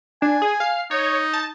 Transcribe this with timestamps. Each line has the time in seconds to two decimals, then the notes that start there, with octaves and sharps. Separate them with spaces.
0.22 D4 G#5
0.42 G#4
0.60 F5
0.91 D#4 C#5
1.34 A5